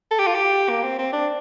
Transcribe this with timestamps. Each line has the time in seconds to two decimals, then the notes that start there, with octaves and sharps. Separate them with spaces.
0.11 A4
0.19 G4
0.27 F4
0.35 G4
0.69 A#3
0.84 C4
0.99 C4
1.13 D4